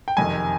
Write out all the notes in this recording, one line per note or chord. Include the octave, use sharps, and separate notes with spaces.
G5
F#1 F2 C3 D#3 G#5